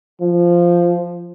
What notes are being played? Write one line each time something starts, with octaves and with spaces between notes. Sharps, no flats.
F3